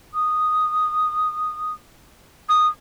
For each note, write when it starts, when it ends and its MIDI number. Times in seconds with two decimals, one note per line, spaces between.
0.13 1.73 87
2.49 2.67 87